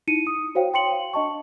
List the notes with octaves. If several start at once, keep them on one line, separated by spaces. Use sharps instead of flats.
D#4 E4 C#7 D#7
D#6
F#4 C5 C#5 F5 G5
G5 C6 C#7 F#7
F5
D4 D#5 A5 C#6